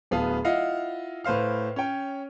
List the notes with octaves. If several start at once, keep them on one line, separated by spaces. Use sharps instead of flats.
D1 B3 G#4 F5 A5
E4 F4 D#5 F5 F#5
A2 B4 C5 F5 F6
C#4 C#5 G5